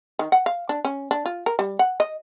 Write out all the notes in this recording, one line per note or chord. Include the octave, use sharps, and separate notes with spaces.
D#3
F#5
F5
D4
C#4
D4
F4
A#4
G3
F#5
D#5